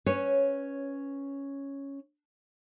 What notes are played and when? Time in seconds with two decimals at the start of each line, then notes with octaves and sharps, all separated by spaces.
0.06 C#4 B4 C#5